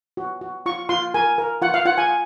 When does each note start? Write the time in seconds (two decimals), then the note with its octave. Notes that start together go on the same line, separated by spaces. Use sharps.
0.17 F#4
0.41 F#4
0.66 F4 C#6
0.89 F4 C6
1.14 A#4 G#5
1.38 A#4
1.62 F4 F#5
1.74 F5
1.85 F4 F#5
1.98 G#5